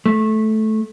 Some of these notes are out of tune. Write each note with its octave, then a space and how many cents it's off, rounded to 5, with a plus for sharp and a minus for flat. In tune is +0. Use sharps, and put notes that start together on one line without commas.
A3 -15